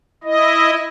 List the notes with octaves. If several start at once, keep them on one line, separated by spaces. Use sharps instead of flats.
E4 D#5